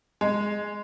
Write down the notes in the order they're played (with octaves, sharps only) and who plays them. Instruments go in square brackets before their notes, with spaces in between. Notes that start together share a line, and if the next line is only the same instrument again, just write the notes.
[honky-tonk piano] G#3